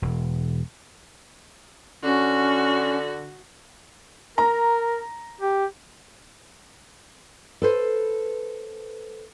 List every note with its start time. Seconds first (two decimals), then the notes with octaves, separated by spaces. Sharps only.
0.02 E1
2.03 D3 C#4 F#4
4.38 A#4 A#5
5.41 G4
7.62 A4 B4 C5